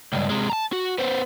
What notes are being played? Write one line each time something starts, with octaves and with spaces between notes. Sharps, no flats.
C#2 G2
C3 G#3
A5 A#5
F#4
B3 C5